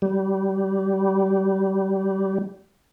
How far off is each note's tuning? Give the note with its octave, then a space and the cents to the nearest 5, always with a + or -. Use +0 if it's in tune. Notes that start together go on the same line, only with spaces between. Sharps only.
G3 -25